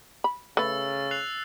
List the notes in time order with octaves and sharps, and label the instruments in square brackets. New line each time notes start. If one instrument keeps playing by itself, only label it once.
[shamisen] B5
[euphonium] C#3 [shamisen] A3 B4 [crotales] E6 A6
[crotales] F#6 C7 F7